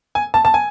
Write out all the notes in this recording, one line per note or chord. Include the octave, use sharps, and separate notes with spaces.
G#5
A5
A5
G#5